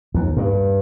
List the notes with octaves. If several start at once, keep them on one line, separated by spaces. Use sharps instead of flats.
D#2
G2